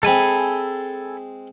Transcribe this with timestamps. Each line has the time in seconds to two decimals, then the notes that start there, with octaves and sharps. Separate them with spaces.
0.03 G#3 C4 A4 G#5 B5